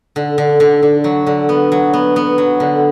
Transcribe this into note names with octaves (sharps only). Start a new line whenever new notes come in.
D3
D3
D3
D3
F#3
D3
B3
F#3
B3
B3
F#3
D3